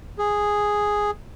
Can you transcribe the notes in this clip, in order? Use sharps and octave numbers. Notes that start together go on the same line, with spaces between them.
G#4